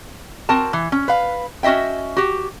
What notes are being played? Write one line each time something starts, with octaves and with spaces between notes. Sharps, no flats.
C4 F#4 A#4 A5
E3
C#4
B4 F5
C#4 F#4 D#5 E5 G5
F#4 G4